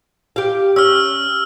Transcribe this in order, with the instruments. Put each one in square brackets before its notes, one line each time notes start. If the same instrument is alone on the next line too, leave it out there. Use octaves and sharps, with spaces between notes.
[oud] G4 F5
[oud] C#4 [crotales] E6 F6